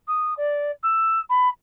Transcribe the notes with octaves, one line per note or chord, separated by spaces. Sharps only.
D#6
D5
E6
B5